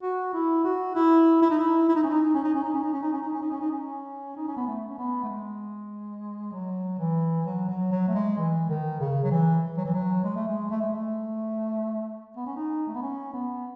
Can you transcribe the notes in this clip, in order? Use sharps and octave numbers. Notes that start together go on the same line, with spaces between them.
F#4
E4
F#4
E4
E4
D#4
E4
E4
D#4
C#4
D#4
C#4
D#4
C#4
D#4
C#4
D#4
C#4
D#4
C#4
D#4
C#4
D#4
C#4
D#4
C#4
D#4
C#4
B3
A3
C#4
B3
A3
G#3
F#3
E3
F#3
F#3
F#3
A3
G#3
E3
D#3
C#3
F#3
E3
F#3
E3
F#3
G#3
A3
G#3
A3
G#3
A3
B3
C#4
D#4
A3
B3
C#4
B3